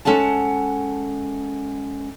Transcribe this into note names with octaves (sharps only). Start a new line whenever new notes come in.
G#3 C#4 A4 F#5 A5